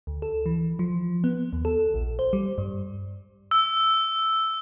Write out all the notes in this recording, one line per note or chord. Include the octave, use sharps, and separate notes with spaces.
D2
A4
E3
F3
B3
D#2
A4
A#1
C5
G3
G2
E6